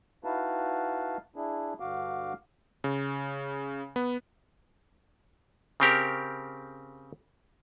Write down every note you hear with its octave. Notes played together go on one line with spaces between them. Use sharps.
D#4 E4 F#4 B4 F5 A5
D4 E4 G#4
G2 D3 F#4 F5 D6
C#3
B3
C#3 C4 G4 A#4